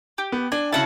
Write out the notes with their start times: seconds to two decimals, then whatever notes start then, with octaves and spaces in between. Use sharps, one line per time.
0.18 G4
0.32 B3
0.52 D4 G#5
0.73 C#3 E4 F#4 F#5 A5